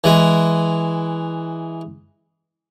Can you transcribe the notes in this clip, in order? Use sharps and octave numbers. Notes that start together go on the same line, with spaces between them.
E3 G#3